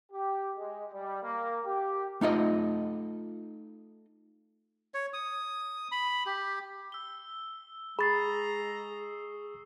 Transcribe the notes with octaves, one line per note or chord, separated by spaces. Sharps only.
G4
G#3
G3
A#3
G4
A3 D#4 F4 D#5
C#5
D#6
B5
G4
E6 G7
G#3 G#4 A#5 B5 C#6 D#6 A6 C7